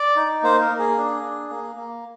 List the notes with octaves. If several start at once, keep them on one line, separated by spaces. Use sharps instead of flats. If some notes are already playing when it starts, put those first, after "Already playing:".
Already playing: D5
D#4
A#3 C5
A#4
A#3
G#4
D4
D4
A#3
A#3